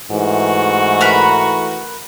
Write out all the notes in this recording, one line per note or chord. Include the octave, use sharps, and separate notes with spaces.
G#2 E3 A3 F#4
A#4 B4 B5